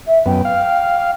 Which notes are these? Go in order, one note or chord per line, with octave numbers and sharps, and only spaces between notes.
E5
F#2 B3 G5
F5